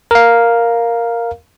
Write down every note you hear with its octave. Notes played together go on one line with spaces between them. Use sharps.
A#4 F5